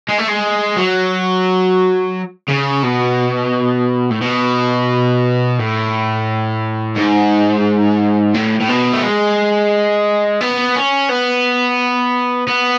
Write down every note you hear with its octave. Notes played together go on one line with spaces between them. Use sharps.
G#3
A3
G#3
F#3
C#3
B2
A2
B2
A2
G#2
A2
A2
B2
A3
G#3
B3
C#4
B3
B3